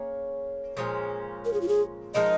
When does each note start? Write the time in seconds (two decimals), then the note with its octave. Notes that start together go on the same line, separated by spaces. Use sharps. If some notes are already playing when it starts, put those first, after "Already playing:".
Already playing: A#3 C#4 G#4 C#5
0.77 A#2 F3 G#3 C#4
1.45 A#4
1.53 G#4
1.61 F4
1.68 G#4
2.14 F3 G#3 D#4 A#4 D#5